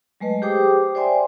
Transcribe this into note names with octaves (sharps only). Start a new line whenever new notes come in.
F#3 G#3 A3 B4 D#5
G4 G#4 C5 G5 D6 D#6
C5 D5 E5 G5 G#5 C6